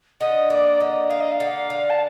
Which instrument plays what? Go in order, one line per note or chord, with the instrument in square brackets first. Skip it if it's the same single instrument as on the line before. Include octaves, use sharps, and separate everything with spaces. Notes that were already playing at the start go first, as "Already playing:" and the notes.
[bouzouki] D3 [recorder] D#5
[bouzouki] A#3 [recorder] D#5
[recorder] D5
[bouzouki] D3 [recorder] D#5
[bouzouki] A#3 [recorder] F5
[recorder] D#5
F5
[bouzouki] D3
D3
[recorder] A5